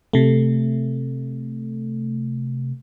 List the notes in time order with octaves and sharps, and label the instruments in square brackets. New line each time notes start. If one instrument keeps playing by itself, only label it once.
[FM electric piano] C3 A3